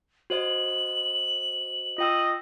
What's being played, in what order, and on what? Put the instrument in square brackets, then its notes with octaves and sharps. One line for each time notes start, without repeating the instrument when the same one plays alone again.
[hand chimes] F#4 C5 D#5 [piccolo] F#7
[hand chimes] F4 G5 E6 [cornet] D#5